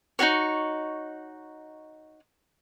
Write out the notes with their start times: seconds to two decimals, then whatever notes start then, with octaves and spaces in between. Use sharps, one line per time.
0.19 D#4 F4 F#4 C#5